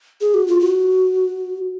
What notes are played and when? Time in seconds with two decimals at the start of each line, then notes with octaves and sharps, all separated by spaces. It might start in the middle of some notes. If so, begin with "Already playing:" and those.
0.21 G#4
0.34 F#4
0.48 F4
0.61 F#4